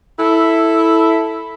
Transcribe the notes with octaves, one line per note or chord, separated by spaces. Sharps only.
E4 A4